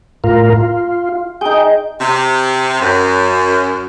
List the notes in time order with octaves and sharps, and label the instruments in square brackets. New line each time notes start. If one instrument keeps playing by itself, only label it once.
[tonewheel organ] A2 F4 A#4
F4
[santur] D#4 G#4 [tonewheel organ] G5
[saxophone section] C3
F#2